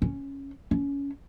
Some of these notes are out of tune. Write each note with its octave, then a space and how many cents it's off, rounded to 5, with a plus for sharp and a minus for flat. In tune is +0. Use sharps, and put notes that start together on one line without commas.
C#4 -5
C#4 +20